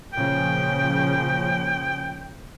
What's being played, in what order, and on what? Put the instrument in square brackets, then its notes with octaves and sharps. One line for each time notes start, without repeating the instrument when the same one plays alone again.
[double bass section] A#2 C#3 F3 [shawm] G5